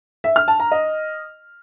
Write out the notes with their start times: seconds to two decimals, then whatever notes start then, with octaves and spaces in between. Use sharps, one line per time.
0.24 E5
0.36 F6
0.48 A5
0.60 A#5
0.72 D#5